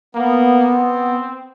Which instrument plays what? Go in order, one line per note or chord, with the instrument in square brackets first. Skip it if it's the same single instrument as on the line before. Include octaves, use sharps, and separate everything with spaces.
[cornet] A#3 [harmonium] B3
[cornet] C4